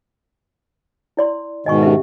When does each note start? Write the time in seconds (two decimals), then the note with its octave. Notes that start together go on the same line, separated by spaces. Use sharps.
1.17 E4 D5 C6
1.66 G#2 B2 D#3 D#5 G#5 C#6
1.83 C#4 G4 E5